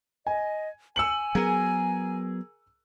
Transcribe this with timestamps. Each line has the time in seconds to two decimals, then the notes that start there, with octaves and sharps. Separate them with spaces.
0.27 D#5 G#5
0.96 G#5 E6 C#7 F#7
1.35 F#3 B3 G#4 A#4